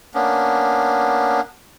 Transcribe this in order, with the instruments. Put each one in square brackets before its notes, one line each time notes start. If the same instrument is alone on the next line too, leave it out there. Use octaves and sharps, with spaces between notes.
[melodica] A#3 B3 C#4 D4